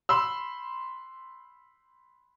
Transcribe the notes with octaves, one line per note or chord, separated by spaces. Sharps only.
B5 C6 E6